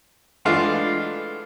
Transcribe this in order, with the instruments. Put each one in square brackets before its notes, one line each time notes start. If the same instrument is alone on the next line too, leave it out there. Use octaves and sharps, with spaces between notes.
[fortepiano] E3 G#3 A3 D4 F4